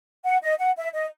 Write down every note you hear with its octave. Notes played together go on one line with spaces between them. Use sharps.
F#5
D#5
F#5
E5
D#5